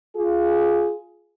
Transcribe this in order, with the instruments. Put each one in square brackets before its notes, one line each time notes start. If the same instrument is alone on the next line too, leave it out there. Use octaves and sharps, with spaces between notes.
[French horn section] F4 G#4